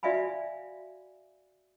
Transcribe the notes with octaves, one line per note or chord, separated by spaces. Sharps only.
F#4 D5 E5 F5 G#5 B5